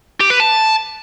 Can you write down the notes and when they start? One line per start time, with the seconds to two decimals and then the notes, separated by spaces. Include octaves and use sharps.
0.21 G4
0.30 B4
0.40 A5